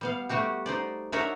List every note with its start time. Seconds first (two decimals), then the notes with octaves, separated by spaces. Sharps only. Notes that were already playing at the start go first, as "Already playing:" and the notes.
0.01 G3 B3 F5
0.29 G3 A3 F#4 G4
0.66 D#4 C5 D5
1.12 D4 D#4 F#4 A#4 C#5 E5